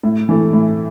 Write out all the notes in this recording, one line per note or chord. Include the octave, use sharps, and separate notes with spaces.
A2
E3 A3
A2